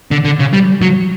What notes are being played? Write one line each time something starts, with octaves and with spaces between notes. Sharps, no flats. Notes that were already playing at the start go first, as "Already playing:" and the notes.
D3
D3
C#3
G3
F#3